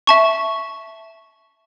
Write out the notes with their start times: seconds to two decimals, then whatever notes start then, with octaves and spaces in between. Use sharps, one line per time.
0.07 E5 A5 C#6